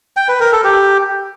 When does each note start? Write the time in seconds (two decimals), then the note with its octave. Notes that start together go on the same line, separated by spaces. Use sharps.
0.17 G5
0.28 B4
0.40 A#4
0.52 A4
0.64 G4